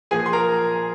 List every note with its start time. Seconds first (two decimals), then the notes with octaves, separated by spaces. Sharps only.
0.11 A#2 F3 G#4 G#5
0.26 C6
0.33 A#4 A#5